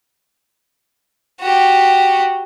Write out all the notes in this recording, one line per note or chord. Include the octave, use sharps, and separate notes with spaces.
F#4 G4